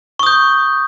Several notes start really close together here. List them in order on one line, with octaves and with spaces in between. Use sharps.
C#6 D#6 G6